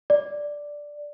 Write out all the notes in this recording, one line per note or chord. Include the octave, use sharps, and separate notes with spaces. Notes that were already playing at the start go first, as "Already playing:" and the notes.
D5